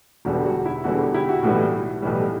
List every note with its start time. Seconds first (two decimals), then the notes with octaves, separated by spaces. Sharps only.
0.25 E1 E2 D3 G3 F#4
0.45 F#4
0.65 E4
0.84 E1 E2 D3 G3 F#4
0.99 F#4
1.14 E4 G4
1.29 F#4
1.43 B1 A2 E3 G3 F#4
2.02 B1 A2 E3 G3